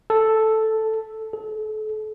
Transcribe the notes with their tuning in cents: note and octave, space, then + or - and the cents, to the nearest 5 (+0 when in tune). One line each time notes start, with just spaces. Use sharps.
A4 +0
A4 -35